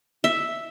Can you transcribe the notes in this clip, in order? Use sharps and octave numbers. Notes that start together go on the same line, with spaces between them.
E5